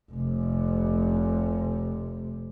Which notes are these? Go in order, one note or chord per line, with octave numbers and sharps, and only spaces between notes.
F1 C3